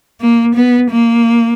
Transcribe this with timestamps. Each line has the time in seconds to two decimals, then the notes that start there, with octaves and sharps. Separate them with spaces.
0.20 A#3
0.55 B3
0.90 A#3